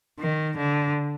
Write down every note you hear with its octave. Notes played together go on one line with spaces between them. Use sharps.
D#3
D3